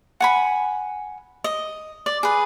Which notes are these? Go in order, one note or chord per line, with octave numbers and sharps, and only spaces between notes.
F#5 G#5 B5
D#5
D5
G#4 B4